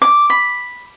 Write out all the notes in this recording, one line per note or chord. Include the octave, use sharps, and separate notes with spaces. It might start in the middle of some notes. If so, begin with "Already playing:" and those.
D6
B5